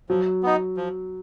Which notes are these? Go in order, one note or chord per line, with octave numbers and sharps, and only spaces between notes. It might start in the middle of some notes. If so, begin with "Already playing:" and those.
F3 F#3
B3 D#4
F3